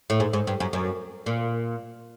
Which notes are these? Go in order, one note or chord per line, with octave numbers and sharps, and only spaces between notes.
A2
G#2
G#2
G2
F#2
F#2
A#2